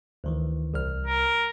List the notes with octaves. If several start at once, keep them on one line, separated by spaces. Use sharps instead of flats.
D2 D#3 E3
C2 F6
A#4